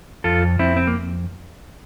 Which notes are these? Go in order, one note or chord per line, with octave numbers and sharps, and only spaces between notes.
F2 F4 A4
F2 C4 E4
C4
A#3